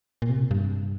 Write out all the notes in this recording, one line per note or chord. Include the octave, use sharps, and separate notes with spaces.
A#2
C3
G2